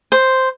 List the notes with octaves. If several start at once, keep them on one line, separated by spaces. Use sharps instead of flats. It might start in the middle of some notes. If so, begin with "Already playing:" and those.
C5